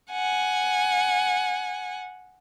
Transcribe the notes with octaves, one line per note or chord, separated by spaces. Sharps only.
F#5 G#5